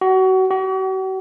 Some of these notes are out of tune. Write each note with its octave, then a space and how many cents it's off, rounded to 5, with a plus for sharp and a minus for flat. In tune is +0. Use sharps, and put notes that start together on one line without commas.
F#4 +30
F#4 +45